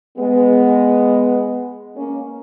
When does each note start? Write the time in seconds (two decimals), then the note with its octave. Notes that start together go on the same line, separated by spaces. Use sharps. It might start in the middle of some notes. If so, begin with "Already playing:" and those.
0.17 G#3 B3
1.96 A#3 C#4